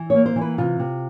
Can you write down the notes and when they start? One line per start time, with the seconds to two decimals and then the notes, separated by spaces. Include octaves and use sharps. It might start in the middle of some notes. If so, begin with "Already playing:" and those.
Already playing: E3
0.10 A#3 C#5
0.26 C5
0.36 E3
0.41 B4
0.58 C3 F4
0.79 C3